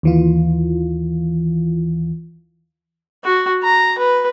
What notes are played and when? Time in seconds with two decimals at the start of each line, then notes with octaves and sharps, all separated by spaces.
0.03 D#2 E3 F4
3.24 F#4
3.63 A#5
3.99 B4